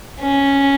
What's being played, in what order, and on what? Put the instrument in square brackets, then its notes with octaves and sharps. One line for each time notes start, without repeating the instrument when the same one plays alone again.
[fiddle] C#4